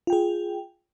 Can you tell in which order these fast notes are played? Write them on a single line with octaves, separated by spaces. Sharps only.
F4 G5 G#4